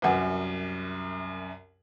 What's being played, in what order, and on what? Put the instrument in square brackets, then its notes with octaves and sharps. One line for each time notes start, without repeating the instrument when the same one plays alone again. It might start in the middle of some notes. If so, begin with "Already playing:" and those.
[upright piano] C2 F#2 [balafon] B4 F#5 G#5